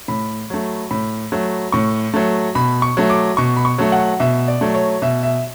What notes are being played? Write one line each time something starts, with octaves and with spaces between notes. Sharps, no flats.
A2 B5
F#3 A3
A2 B5
F#3 A3
A2 C#6
F#3 A3
B2 B5
C#6
F#3 A3
D6
B2 C#6
B5
C#6
F#3 A3
F#5
B2 E5
D5
F#3 A3
C#5
B2 E5
E5